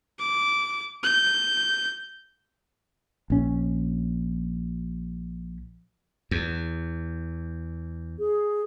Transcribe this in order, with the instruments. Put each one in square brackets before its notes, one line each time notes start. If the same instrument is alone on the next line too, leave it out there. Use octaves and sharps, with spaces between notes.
[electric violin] D6
G6
[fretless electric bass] A#1 C#4
[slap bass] E2
[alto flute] G#4